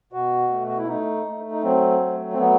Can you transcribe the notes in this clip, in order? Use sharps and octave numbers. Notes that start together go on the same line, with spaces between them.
B2 F#4
A3
F#4
E4
A3 D#4
A3
D#4
F#3 C4
A3
C4
F#3 B3